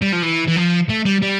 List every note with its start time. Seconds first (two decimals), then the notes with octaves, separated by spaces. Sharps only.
0.02 G3
0.13 F3
0.23 E3
0.48 E3
0.57 F3
0.89 A3
1.05 G3
1.22 G3